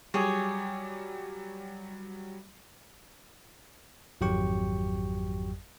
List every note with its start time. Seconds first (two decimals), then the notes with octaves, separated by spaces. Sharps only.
0.14 F#3 G3 G4 G#4 C#5
4.21 G#1 F2 F#3 G4 G5 C#6